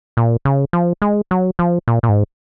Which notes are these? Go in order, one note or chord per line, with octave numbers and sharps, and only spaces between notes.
A#2
C#3
F3
G#3
F#3
F3
A#2
A#2
G#2